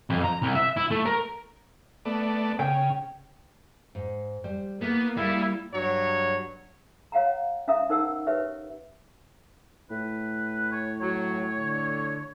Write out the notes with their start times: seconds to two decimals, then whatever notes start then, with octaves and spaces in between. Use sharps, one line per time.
0.10 F2
0.24 A#5
0.42 C2
0.55 E5
0.76 E4
0.91 A3
1.06 A#4
2.05 A3 B3 D5
2.59 C#3 G5
3.95 G#2
4.44 G3 C5
4.82 A#3 B3 E4
5.17 G3 E4 G#4 F5
5.73 G2 F#3 C#5
7.12 C#5 F5 F#5 A#5
7.68 C#4 E5 F5 A#5 D#6
7.89 D#4 A#4 C5 F#5 E6
8.27 G4 B4 C#5 E5
9.91 A2 B4
10.72 C#5
11.00 F#3 C#5
11.58 D3